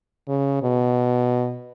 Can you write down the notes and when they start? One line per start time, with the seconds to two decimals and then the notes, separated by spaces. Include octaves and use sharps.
0.28 C#3
0.63 B2